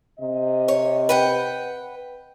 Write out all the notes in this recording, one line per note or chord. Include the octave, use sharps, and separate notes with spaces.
C3 D#5
C#5
B4 F#5 G5